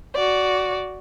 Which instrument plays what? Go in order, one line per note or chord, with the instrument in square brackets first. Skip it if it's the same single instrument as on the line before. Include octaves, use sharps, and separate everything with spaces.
[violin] F#4 D5